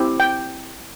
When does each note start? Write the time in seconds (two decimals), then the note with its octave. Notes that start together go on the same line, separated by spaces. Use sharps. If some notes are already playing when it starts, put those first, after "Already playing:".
Already playing: C4 E4 G4
0.20 G5